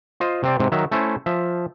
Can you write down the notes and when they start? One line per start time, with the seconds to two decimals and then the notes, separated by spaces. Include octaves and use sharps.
0.20 F4 C5 D#5
0.43 C3 C4 D5
0.59 G#2 C3
0.72 D#3 F#3 E5
0.91 A3 C#4 E4 C5
1.26 F3 E5